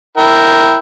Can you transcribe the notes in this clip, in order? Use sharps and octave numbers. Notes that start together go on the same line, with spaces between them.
E4 A#4 G5